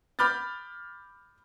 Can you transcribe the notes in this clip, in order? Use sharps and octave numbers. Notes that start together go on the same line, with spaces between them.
B5 D6 F6 G6 A6